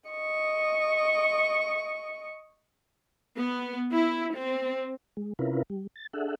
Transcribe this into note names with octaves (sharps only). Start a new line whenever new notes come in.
D#5 C#6
B3
E4
C4
G#3
C3 C#4 E4 F4 A#4 B4
G3
A6
D4 G#4 A4 E5 F#5